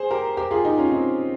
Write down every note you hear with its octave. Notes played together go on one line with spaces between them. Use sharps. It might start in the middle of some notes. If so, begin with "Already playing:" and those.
Already playing: G#4 C5
G4 A#4
G4 A#4
F4 G#4
D#4 G4
C#4 F4
C4 D#4